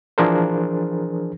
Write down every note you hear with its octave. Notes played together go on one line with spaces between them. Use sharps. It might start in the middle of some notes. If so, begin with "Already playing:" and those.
E3 F3 D4 G#4 A#4 C5